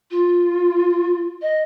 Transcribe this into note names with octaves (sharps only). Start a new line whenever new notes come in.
F4
D#5